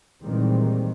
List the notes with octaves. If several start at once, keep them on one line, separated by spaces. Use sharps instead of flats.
A#2 D#3 E3 G3 G#3 C4